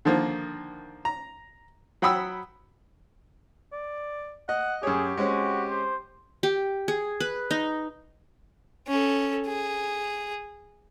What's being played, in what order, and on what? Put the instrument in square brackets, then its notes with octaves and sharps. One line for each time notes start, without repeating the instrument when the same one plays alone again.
[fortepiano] D3 D#3 F3 A#3
A#5
F#3 F#5 G5 B5 D#6 E6
[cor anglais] D5
[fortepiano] D#5 [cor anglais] F#5
[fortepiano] F#2 C#5 [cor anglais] G4 [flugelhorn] G#4
[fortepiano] G#3 C4 C#4 [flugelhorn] F#4
[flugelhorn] C5
[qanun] G4
G#4
B4
D#4
[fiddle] C#4 A4
G#4